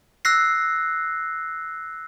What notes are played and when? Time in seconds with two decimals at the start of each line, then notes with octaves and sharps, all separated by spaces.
0.25 E6 F#6 A#6 C7